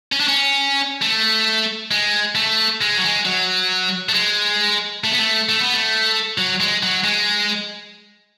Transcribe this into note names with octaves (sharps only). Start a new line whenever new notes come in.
C#4
D4
C#4
A3
G#3
A3
G#3
F#3
G#3
F#3
A3
G#3
A3
B3
A3
A3
B3
A3
F#3
G#3
F#3
G#3